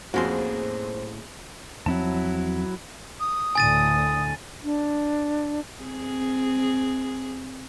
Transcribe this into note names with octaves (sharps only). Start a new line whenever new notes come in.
F2 A2 A#3 C#4 F#4 G#4 C5 C6
E2 F3 F#3 C4 E4 A5
D#6
D2 A2 D3 G#5 A6 D#7
D4
C4 G#4